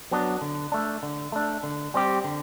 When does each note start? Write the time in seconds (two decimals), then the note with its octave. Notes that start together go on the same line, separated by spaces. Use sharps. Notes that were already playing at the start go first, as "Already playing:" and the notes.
0.11 F#3 B3 D4
0.41 D3
0.72 A3 D4
1.03 D3
1.32 A3 D4
1.63 D3
1.94 G3 C4 G4
2.24 D3